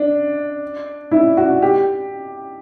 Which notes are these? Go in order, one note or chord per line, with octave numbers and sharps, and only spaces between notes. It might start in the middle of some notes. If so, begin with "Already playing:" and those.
Already playing: D4
E4
F#4
G4